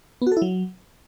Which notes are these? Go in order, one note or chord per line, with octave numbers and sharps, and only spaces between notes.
B3
F#4
A4
E4
F#3